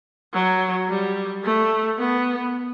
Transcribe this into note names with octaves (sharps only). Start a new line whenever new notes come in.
F#3
G3
A3
B3